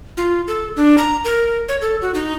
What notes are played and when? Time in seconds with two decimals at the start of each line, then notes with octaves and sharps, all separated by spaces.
0.17 F4
0.47 A4
0.76 D4
0.98 A#5
1.24 A#4
1.69 C#5
1.81 A4
2.02 F#4
2.14 D#4